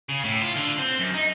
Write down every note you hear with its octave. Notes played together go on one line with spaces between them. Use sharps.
C#3
A2
F4
D3
C4
F#2
D#4